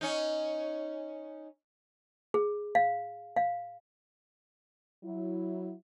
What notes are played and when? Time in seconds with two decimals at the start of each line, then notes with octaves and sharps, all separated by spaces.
0.01 C#4 D#4
2.34 G#4
2.75 F5
3.36 F5
5.04 F#3 E4